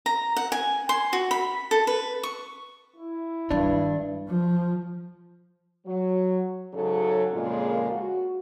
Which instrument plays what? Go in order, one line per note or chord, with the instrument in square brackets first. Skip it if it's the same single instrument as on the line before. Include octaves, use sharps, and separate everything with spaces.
[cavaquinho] A#5
F#5
G#5
C6
F#4
B5
A4
B4
C#6
[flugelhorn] E4
[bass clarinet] G2 [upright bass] D#3 G3 [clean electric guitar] D4
[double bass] F3
[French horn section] F#3
G#2 C#3 F#3 G#4 A4
F2 A#2 C#3 G#3 A#3 F4
F#4